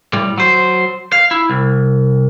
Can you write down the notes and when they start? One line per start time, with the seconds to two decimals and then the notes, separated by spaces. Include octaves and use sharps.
0.13 A2 G3
0.38 F#3 C5
1.12 F5
1.31 E4
1.50 C2